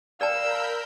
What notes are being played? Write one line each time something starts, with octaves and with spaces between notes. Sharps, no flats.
A#4 D5 F5 G5 A5 B5 E6 G6